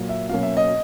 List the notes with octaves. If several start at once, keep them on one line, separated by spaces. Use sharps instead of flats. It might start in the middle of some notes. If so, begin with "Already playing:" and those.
Already playing: A#2 F#3 A#3
E5
B2 F#3 A#3 C#4 F5
E5
D#5